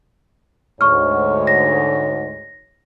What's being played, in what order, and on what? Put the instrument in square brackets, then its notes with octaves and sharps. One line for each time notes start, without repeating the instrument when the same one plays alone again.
[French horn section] D2 G#2 C#5 [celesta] C#6 F6
[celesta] A#6